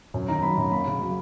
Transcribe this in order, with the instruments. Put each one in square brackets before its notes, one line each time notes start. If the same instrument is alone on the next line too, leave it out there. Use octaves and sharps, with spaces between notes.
[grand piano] F#2
D#3 A#5
F#3 B5
F#2
A#3 B5
C#3
F#3